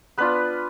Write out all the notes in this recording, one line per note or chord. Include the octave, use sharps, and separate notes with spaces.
B3 D4 F4 B4